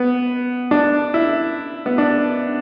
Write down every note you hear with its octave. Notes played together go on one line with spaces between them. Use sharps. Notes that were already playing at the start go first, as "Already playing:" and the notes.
Already playing: B3
D4
E4
B3
D4